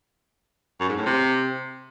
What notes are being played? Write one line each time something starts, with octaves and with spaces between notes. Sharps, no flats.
F#2
G#2
A2
C3